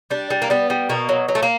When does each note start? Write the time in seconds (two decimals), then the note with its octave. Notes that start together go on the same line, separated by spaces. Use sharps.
0.10 G3 D4
0.30 G3
0.42 A#3
0.50 G3 B3
0.70 G3
0.90 B2 A#3
1.09 F#3
1.28 F#3
1.35 A3
1.43 A#3